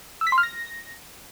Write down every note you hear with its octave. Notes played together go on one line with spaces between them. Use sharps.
E6
B6
C6
F6
A#6